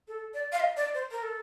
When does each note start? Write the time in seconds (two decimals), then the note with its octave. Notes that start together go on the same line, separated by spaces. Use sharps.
0.08 A4
0.34 D5
0.52 F5
0.60 D#5
0.77 D5
0.94 C5
1.11 A#4
1.23 A4